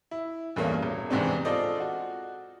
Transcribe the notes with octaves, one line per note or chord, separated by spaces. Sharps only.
E4
E2 G2 A3 A#3 C#4
E1
E2 G#2 C3 G#3 C4 D4
F4 A4 C5 D5 D#5
F#4